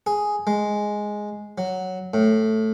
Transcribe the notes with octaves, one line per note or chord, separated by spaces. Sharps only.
G#4
G#3
F#3
A2